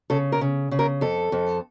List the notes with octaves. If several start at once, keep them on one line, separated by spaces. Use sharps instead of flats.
C#3 A4
A#4
C#3
C#3
A#4
F2 A4
F2